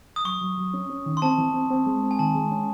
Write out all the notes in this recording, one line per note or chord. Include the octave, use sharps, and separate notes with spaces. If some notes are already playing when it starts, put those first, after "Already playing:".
D#6
F#3 C#6
F#3
F#3
C#4
C#4
D#3
C6
C4 A5
E3
C4
C4
G#3
C4
G#5
D#3 A5
G#3
C#4